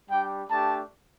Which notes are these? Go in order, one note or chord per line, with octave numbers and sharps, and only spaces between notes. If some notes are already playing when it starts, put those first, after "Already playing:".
G3 D4 G4 G5
A3 D4 G4 A5